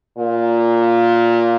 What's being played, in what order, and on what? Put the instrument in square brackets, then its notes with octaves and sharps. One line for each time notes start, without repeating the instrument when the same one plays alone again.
[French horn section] A#2